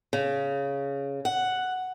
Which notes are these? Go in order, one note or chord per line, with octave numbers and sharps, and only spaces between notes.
C#3
F#5